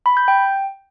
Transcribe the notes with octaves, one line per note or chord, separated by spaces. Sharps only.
B5
G6
G5